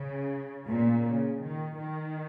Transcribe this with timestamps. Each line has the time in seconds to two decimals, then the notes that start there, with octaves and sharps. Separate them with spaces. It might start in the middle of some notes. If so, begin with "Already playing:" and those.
Already playing: C#3
0.67 A#2
1.04 C#3
1.41 D#3
1.77 D#3